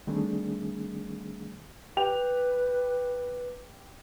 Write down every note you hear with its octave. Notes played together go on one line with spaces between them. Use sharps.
D#3 G3 A3 C4 D4 G#4
G4 B4 G5 F7